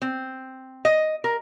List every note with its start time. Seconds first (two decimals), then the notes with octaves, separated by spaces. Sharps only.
0.02 C4
0.85 D#5
1.24 A#4